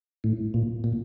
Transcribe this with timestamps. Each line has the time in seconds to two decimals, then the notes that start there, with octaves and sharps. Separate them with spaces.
0.24 A2
0.54 A#2
0.84 A#2